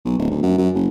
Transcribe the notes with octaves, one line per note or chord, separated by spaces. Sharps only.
B1
D1
D2
F#2
F#2
F#1